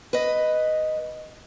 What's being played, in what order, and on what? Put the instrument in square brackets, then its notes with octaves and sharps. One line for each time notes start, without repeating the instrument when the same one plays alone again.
[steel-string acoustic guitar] B4 D#5